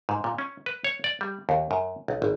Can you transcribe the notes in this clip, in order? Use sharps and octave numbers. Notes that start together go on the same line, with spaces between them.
G#2
A#2
C#4
B4
C#5
D5
G3
D#2
F#2
B1
G#1